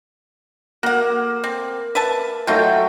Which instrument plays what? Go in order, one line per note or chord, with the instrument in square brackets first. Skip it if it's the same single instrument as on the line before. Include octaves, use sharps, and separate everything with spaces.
[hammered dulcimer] A#3 [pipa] F#4 F#5
[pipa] C4
B4 E5 A5
[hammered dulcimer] F#3 A3 G5 [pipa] D#4 F4